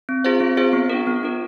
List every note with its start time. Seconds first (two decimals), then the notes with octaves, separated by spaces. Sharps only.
0.09 C4
0.24 F4 G#4 C5 F5
0.40 C4
0.57 F4 G#4 C5 F5
0.73 B3
0.90 D4 F4 A#4
1.07 B3
1.23 D4 F4 A#4